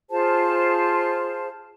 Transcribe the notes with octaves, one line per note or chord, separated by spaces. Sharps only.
F4 G#4 C5 A5